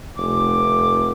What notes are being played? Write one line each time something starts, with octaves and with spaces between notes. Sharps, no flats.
F1 D6